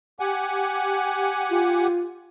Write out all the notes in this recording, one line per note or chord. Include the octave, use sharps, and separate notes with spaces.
G4 F#5 G#5
F4